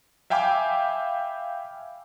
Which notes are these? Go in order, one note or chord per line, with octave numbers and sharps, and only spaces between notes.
E5 F5 G5 G#5 B5 D6